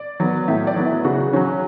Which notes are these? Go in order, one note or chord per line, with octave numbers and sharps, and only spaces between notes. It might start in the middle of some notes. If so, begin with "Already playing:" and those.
Already playing: D5
F#3 B3
A2 E5
D5
F#3 B3
E4
C#3 F#4
F#3 C#4